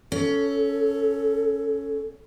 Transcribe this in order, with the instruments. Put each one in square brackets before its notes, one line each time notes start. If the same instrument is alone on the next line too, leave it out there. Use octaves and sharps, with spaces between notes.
[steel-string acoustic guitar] C#4 [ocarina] A4